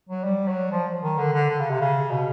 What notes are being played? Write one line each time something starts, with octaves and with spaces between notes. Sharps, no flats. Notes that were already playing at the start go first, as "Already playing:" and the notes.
F#3
G3
F#3
F3
D#3
D3
D3
D3
C#3
C3
C#3
B2